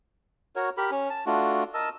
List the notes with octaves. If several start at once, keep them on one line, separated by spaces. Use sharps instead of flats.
F#4 A#4 C#5
G4 A#4 B5
C#4
A5
A3 D4 F4 F#4
A#4 D#5 A5 E6